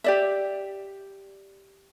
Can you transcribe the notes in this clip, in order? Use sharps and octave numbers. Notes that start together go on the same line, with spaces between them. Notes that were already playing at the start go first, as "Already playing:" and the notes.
G4 D5 E5